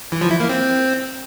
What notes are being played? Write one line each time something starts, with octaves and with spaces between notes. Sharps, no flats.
E3
F3
E4
A#3
C4